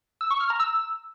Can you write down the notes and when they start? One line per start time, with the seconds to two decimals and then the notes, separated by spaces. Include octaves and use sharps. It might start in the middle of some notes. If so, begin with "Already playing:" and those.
0.21 E6
0.30 C#6
0.40 F6
0.50 A#5
0.60 E6